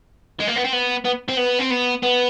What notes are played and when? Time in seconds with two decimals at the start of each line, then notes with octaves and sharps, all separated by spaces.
0.40 G#3
0.47 A#3
0.56 B3
0.64 C4
0.73 B3
1.05 B3
1.29 C4
1.38 B3
1.59 C4
1.71 B3
2.03 B3